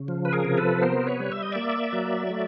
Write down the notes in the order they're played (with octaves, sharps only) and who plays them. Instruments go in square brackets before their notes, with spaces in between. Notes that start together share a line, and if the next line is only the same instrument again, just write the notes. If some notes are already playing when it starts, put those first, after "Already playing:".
Already playing: [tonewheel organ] C#3
F3
B4
G#4 A#4
C3
A4 B4
B3 A#4 C5
B4 C#5
G3
E5
D#5
A#3 D5 E5
F#3
A3